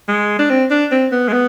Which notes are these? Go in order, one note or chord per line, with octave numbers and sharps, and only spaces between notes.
G#3
D4
C4
D4
C4
B3
G#3
B3